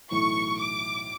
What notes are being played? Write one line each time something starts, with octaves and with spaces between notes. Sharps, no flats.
B1 A2 E3 A3 E4 C#6
D6